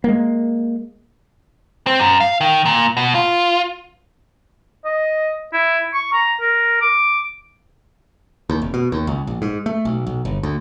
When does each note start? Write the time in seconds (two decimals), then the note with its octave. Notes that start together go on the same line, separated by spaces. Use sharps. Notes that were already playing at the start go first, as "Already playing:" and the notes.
0.04 G#3 A#3
1.87 C4
2.00 F#2
2.20 F5
2.41 D#3
2.65 A#2
2.97 B2
3.15 F4
4.85 D#5
5.53 E4
5.94 C#6
6.13 A#5
6.41 A#4
6.81 D6
8.50 D#2
8.62 F1
8.74 B2
8.92 D#2
9.07 C#2
9.27 A#1
9.42 G#2
9.66 A3
9.85 B1
10.07 B1
10.25 G1
10.43 D2